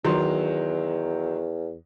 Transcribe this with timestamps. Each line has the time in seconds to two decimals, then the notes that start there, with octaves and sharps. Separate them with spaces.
0.04 E2 D#3 F#3 C6